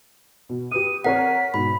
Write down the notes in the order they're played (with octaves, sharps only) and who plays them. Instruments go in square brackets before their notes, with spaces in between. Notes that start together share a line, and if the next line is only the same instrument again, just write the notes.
[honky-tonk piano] B2
[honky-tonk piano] G4 B4 D#6 [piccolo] D#7
[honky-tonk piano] C4 A#4 C#5 [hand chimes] F#5 [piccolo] B6
[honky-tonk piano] G#2 B2 [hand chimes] B5